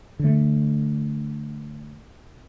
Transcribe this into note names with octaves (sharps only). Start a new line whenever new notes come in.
D3 A3